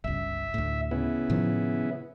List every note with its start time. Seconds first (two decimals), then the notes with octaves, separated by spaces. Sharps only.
0.04 G1 C#2 E5
0.54 D2 A2
0.91 C#3 B3 E4
1.30 A2 D#3 F3